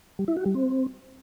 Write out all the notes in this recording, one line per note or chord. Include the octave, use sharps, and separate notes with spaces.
G3
E4
F#4
G3
C4